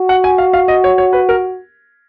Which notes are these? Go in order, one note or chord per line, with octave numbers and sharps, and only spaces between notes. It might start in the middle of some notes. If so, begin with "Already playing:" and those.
Already playing: F#4
F#5
G#5
F5
F5
D#5
C#5
C#5
B4
A#4